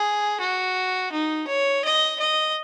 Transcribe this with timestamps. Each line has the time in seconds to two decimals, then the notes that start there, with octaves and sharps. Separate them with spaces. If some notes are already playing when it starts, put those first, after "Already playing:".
Already playing: G#4
0.40 F#4
1.12 D#4
1.48 C#5
1.84 D#5
2.20 D#5